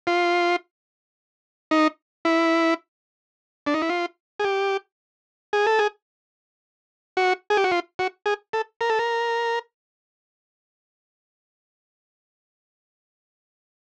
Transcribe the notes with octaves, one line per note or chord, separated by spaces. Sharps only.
F4
D#4
E4
D4
D#4
E4
F4
G#4
G4
G#4
A4
G#4
F#4
G#4
G4
F#4
F4
F#4
G#4
A4
A#4
A4
A#4